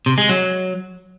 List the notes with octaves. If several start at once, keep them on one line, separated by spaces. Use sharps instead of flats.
C3
G#3
F#3